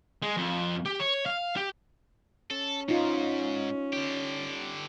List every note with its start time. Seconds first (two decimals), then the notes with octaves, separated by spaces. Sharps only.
0.22 G#3
0.37 F2
0.85 G4
0.99 C#5
1.26 F5
1.56 G4
2.51 C#4 A4
2.89 G#2 D#4 F4
3.93 D3 G4